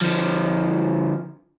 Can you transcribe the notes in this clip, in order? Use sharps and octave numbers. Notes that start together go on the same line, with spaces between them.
D3 F3